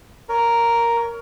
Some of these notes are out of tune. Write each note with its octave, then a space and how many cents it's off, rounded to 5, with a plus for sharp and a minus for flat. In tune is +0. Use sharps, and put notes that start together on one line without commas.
A#4 +0 C#5 +25